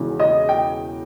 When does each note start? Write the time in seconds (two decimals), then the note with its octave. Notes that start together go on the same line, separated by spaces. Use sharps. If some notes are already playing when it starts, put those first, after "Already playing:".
Already playing: E1 E2 C#3 E3
0.20 D#5
0.49 G5